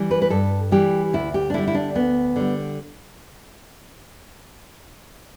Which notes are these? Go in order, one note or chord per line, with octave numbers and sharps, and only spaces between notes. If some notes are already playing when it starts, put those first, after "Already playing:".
Already playing: E3 G3
B4
B4
G2 A4
E3 G3 G4
D2 E4
G4
D4
D3 G3 E4
E4
D4
D2 B3
D3 G3